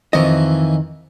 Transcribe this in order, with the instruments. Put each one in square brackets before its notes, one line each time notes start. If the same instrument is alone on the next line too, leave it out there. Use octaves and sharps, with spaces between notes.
[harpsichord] F2 E3 [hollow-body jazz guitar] D#3 D#5